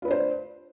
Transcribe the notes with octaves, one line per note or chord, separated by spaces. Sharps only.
D4 F4 B4 C5